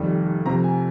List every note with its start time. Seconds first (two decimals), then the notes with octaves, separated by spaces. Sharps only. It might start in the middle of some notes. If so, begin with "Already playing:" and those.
Already playing: F1 F2 D#3 G3
0.45 F2 C3 F3 A#5
0.64 G#5